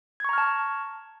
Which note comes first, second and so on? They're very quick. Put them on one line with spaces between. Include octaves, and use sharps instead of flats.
G#6 C#6 A#5 F6 A5